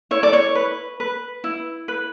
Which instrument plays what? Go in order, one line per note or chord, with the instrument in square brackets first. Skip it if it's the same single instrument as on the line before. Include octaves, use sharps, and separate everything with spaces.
[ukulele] E4 C#5
D5
C#5
B4
B4
E4
B4